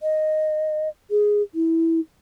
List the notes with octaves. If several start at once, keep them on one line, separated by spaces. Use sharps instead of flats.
D#5
G#4
E4